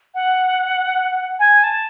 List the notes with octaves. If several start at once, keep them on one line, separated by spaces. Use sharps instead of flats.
F#5
G#5
A5